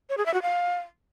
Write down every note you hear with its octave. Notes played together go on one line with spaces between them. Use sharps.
C#5
G#4
E5
F#4
F5